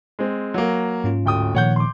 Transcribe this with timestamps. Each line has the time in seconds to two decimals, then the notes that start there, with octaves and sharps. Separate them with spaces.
0.19 G#3 C4
0.54 F#3 A#3
1.04 G#2 C#4 F4
1.26 D1 G5 D#6
1.55 A#2 D#3 F3 C#5 F#5 G6
1.76 C6 D6